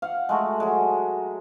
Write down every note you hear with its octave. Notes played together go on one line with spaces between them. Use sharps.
F5 F#5
G#3 A3 F#4
F#3 G#3